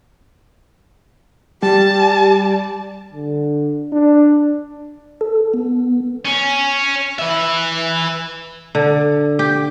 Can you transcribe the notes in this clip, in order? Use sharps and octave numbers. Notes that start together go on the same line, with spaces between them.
G3 G4 A5
D3
D4
A4
B3
C#4
B4 E5
D3
G4